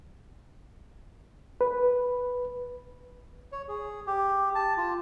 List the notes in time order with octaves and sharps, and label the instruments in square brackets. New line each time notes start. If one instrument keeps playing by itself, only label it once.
[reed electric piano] B4
[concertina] C#5
G#4
G4
A5
F4